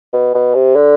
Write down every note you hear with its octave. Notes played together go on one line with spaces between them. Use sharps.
B2
B2
C3
D3